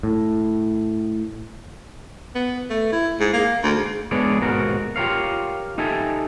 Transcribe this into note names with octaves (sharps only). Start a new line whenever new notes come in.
A2
B3
A3
E4
G#2
A#3
D2
G#2
G#3 B3 D4 G#4 C#5 D5
D#2 G#2 B2 F#4 A#4
F4 G4 A#4 C#5 F5
D#4 G4 A4 E5 G#5